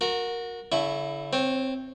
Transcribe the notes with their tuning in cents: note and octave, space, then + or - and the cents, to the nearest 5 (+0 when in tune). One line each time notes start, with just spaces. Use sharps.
F#4 -25 A#4 +0
D3 -45 E4 +5 C#6 -15
C4 +0 C#5 -20